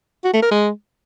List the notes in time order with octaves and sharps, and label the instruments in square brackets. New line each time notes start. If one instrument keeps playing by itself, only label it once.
[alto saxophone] F#4
A3
A#4
G#3